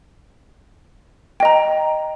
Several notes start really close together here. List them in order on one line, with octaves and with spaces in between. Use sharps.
G5 D#5 A#5